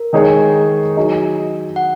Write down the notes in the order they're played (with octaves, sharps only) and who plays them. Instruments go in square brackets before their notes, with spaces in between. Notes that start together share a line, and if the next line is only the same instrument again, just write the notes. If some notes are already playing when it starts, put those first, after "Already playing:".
Already playing: [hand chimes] A#4
[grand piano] D#3 G#3 D#4 G#4 C#5
F#3 D#4 G#4 D#5
[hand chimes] F#5